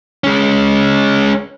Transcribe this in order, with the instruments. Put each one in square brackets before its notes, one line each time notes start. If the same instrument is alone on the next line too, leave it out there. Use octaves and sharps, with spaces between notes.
[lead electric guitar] G#3 C#4